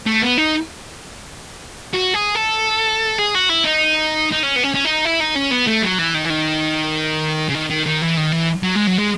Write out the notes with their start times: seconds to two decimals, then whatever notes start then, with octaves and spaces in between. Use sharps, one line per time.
0.06 A3
0.22 B3
0.38 D#4
1.93 F#4
2.14 G#4
2.35 A4
3.18 G#4
3.34 F#4
3.49 E4
3.64 D#4
4.32 D#4
4.43 C#4
4.56 B3
4.64 C#4
4.74 C#4
4.85 D#4
5.05 E4
5.21 D#4
5.36 C#4
5.51 B3
5.67 A3
5.83 F#3
5.99 E3
6.15 D#3
6.25 E3
6.30 D#3
7.49 C#3
7.54 D#3
7.70 D#3
7.86 D#3
8.02 E3
8.17 D#3
8.32 E3
8.63 F#3
8.75 G#3
8.87 F#3
8.98 G#3